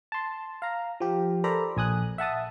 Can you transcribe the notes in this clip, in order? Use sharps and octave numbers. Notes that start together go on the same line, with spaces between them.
A5 C6
F5 A#5
F3 G4
A4 A#4 C5 D5 A#5 B5
A#1 G#5 D#6 F#6
E5 F#5 A5 D#6